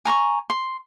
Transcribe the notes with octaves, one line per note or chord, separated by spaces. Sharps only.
G#5 A#5 C6 C#6
C6